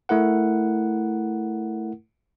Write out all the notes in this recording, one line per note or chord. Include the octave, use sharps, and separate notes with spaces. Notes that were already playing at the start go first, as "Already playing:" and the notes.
A3 E4 A#4 F#5